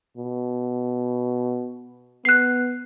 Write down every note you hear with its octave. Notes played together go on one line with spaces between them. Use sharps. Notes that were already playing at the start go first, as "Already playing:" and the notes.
B2
B3 F#6 C7